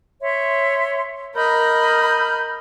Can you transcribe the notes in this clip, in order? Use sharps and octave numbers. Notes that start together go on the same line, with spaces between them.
C#5 E5 C6
A#4 D#5 B5 F6 G6